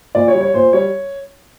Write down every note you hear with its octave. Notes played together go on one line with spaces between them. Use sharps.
A#2 D5
C#5
G3
C#5
A#2 C5
G3 C#5